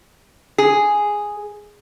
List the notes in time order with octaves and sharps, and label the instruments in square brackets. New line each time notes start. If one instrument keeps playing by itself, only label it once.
[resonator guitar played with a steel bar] G#4